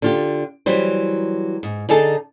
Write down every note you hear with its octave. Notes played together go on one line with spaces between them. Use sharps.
D3 F4 G4
E3 F#3 G3 C5
G#2
D3 D#4 G#4 A4 A5